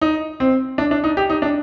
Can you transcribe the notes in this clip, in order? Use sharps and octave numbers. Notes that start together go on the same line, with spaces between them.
D#4
C4
D4
D4
D#4
G4
D#4
D4